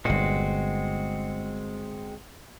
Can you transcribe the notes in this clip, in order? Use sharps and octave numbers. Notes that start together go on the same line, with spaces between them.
G1 A#2 G#3 C4 F#4